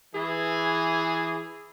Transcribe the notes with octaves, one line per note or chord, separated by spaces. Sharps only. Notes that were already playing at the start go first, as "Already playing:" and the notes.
E3 G#4